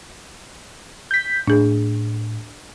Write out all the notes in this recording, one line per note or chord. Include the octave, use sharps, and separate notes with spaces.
G6 B6
A2 D4 G#4